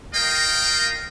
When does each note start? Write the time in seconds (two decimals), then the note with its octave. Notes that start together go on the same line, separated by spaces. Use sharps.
0.14 F4 A#4 D#5 F5 G5